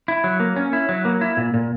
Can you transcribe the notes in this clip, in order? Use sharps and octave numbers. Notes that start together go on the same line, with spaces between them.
E4
F#3
A#3
C#4
E4
F#3
A#3
E4
A#2
A#2